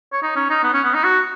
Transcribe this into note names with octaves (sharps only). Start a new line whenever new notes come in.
C#5
D#4
C#4
D#4
B3
C#4
B3
D#4
F#4